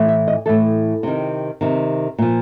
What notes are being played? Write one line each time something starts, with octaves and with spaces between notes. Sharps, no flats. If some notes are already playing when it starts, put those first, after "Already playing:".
Already playing: A2 E3
E5
D#5
A2 E3 A4
C3 D#3
C3 D#3
A#2 F3